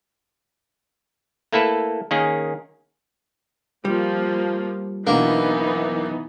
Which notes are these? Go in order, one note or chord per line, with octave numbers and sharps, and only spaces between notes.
A3 A#3 E4 A4 B4
D#3 A#3 C#4 G#4
F3 G3 A#3
F#2 B2 E3 A#3 B3 D4 D#4